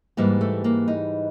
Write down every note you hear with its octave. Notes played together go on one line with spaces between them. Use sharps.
G#2 E3 G3 A#3
A3
A#3
D#4